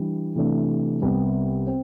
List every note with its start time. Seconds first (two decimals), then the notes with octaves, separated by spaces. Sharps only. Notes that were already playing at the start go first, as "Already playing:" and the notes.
Already playing: E3 G3 D4
0.36 C3 E3 A3 D4
1.02 C2 C3 G3 B3
1.67 C4